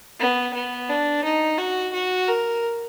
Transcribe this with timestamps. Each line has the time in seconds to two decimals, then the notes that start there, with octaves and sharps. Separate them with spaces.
0.20 B3
0.54 B3
0.89 D4
1.24 D#4
1.58 F#4
1.93 F#4
2.27 A#4